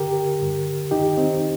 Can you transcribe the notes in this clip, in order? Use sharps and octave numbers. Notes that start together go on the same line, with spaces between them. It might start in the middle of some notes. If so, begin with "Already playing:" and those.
Already playing: G2 D3 G4 A#4
G2 D3
F2 D#3 D#4 G4
C4 D#4